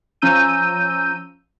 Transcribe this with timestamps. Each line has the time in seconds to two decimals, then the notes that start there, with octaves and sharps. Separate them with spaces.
0.22 F3 C#4 A#5 E6 G6 D#7